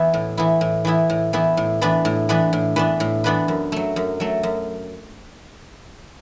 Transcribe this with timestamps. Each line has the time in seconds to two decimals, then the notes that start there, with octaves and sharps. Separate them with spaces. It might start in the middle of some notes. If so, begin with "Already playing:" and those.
Already playing: E3 B3 E4
0.14 A2
0.37 E3 B3 E4
0.61 A2
0.85 E3 B3 E4
1.10 A2
1.33 E3 B3 E4
1.57 A2
1.81 E3 B3 D4 B4
2.05 A2
2.29 E3 B3 D4 B4
2.53 A2
2.76 E3 B3 D4 B4
3.00 A2
3.24 E3 B3 D4 B4
3.48 F#2
3.72 F#3 A3
3.96 F#2
4.20 F#3 A3
4.43 F#2